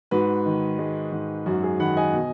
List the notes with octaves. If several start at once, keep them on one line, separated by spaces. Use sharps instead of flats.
G#2 F#4 B4
D#3
G#3
G#2
F#2 F#4
G#4
D#3 F#5 B5
D#5 G#5
B2